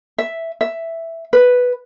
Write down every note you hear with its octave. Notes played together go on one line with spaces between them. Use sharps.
E5
E5
B4